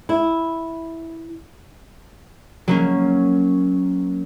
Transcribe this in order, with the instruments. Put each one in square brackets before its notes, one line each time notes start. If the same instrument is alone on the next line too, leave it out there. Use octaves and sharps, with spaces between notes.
[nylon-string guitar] E4
[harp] F#3 A#3 C#4